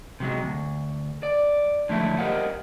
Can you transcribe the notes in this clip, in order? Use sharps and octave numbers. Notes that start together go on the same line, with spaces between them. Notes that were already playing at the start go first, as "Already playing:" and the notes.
C3 F#3 G#3
D2
D5
D3 F3 F#3 G#3 A3 E4
G4 A#4 C5 D#5 F5 F#5